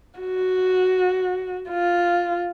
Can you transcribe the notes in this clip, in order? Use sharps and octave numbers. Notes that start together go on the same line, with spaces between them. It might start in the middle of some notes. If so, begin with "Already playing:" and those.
F#4
F4